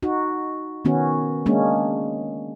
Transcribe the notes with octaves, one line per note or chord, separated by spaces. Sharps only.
D#4 F#4
D#3 B3 C#4 F#4
G#3 A#3 C#4 D4